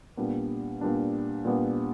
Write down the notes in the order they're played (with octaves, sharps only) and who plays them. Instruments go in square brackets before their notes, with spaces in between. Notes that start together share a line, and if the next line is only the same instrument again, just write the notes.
[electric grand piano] A#2 G3 B3 D4
A#2 G3 B3 D4
A#2 G3 B3 D4